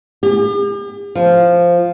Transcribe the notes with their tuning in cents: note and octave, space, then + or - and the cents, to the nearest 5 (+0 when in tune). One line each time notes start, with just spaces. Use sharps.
G4 +45
F3 -5